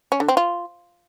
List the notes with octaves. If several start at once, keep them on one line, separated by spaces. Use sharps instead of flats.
C#4
D3
C4
F4